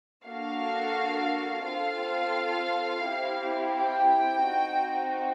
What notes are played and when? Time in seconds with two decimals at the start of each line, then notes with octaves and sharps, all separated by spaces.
0.25 A#3 D4 F#4 A4 F5
1.66 C4 F4 A4 F5
3.06 C4 E4 G4
3.76 G5
4.47 C4 D#4 F#4